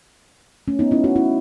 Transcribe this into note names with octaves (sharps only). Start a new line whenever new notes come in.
A3 C#4
B3 D#4
C#4 E4
D#4 F#4
C#4 E4